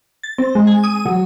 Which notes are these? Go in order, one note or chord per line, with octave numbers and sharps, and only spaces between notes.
A6
C4
G#3
G#5
D#6
F#3